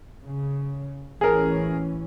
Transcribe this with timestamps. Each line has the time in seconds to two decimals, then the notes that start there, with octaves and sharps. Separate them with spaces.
0.23 C#3
1.21 A1 E3 C#4 G#4 A#4